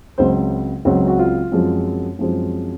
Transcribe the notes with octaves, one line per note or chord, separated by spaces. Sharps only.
C#2 C#3 F#3 C4 C5
C#2 C#3 F#3 C4 F#4
F#4
F4
F#2 F3 G#3 C4
F#2 F3 G#3 C4